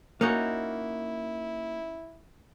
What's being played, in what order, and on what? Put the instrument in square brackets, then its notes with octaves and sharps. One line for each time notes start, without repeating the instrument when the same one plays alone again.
[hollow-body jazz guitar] A#3 [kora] C#4 D#4 F#4 [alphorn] E4